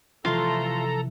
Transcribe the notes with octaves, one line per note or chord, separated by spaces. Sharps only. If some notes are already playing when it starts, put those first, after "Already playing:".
C3 E3 F3 A3 F4 A4 A#5 C6